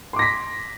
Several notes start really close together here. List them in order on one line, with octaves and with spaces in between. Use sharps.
C6 D6 A#6 B6